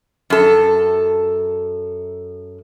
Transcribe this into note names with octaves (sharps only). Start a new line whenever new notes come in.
F#2 A4